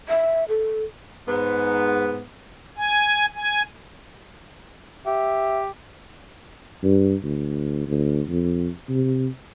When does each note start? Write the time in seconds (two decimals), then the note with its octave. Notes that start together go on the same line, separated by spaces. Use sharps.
0.09 E5
0.49 A4
1.28 G#2 B3
2.77 G#5
3.35 G#5
5.06 G4 E5
6.84 G2
7.23 D2
7.87 D2
8.29 F2
8.89 C3